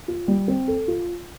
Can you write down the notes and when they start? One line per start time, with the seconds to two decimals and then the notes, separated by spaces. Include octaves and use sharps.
0.08 F4
0.28 G3
0.48 C4
0.68 A4
0.88 F4